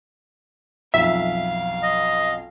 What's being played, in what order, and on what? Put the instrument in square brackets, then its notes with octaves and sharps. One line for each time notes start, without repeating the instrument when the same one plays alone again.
[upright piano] B1 F2 [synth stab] E5 [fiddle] F5
[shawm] D#5